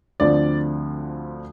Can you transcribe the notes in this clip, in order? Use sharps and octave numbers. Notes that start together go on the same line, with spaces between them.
D2 D3 F3 C4 D5